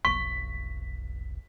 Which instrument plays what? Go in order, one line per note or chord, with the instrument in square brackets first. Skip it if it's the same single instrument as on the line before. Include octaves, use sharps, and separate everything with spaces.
[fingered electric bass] F1 B1 [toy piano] C#6 [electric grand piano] B6